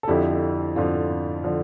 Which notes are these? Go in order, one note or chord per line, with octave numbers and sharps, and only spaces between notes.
A4
F2 D3 F3 E4 G4
F2 D3 F3 F4
D3 F3